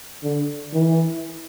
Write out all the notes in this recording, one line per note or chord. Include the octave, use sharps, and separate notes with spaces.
D3
E3